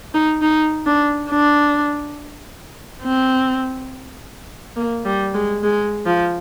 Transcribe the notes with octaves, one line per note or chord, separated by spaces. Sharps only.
D#4
D#4
D4
D4
C4
A#3
G3
G#3
G#3
F3